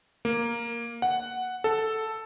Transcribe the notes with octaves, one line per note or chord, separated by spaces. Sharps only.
A#3
F#5
A4